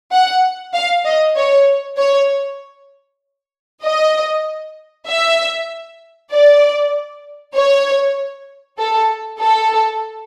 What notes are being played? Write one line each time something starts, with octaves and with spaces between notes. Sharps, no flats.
F#5
F5
D#5
C#5
C#5
D#5
E5
D5
C#5
A4
A4